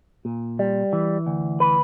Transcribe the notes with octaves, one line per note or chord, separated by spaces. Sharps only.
A#2
G3
E3
D2
B4